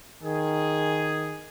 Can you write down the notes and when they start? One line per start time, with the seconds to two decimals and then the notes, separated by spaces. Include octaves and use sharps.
0.23 D#3 G#4